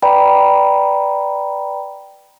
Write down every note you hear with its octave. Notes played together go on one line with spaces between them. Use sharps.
B4 D5 G5 A#5 B5